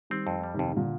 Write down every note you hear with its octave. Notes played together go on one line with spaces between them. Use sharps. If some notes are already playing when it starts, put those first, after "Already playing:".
D#3 G3 C4
F2
G3
F2 C3 D#3
D#3
A#2 D3